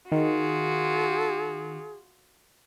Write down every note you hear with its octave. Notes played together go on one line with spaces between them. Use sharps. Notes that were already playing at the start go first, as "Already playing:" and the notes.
D#3 F4 F#4 G#4